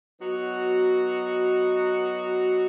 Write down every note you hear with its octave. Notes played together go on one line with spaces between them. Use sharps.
F#3 B3 D#4 F#4